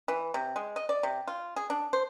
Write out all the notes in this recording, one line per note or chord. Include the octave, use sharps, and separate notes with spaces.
E3
C3
G#3
D#5
D5
C3
F4
G#4
D4
C5